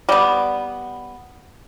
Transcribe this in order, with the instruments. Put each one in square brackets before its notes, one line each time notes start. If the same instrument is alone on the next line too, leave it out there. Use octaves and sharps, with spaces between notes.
[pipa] G3 B3